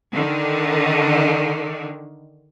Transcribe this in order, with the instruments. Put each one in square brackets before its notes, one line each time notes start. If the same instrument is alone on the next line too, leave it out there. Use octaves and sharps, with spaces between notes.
[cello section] D3 D#3